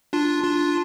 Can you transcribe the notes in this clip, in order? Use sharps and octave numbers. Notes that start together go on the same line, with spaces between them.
D4 F4
D4 F4